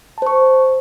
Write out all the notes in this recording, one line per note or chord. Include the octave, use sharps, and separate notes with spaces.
C5 A5 C#6